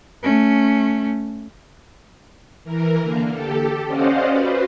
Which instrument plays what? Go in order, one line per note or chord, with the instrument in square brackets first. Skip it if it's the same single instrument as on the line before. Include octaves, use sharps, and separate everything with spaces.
[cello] A3 C#4
[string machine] E3 A#4
D3 A#3
G4 A4
C#4 C5 D5 D#5 F5 F#5
F#4 B4 C5